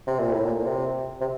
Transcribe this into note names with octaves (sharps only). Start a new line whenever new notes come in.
C3
A#2
A2
A#2
A#2
C3
C3